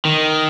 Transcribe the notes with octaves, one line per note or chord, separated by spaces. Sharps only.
D#3